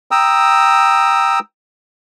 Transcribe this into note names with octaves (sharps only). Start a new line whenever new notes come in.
G5 A#5 D#6 E6